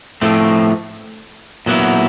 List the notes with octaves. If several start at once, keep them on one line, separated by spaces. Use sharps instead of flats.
A2 F3 A3 C4
A#2 F#3 B3 E4